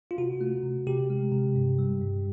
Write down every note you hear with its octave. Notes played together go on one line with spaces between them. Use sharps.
F4
C3 F#4
A3
C3
C3 G4
G#3
C3
G2
G3
G2